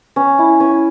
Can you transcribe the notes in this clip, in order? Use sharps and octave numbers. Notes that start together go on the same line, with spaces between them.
C#4
E4
C#4